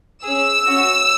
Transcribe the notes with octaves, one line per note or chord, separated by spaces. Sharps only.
C#4 G#4 E6
C#4 F#4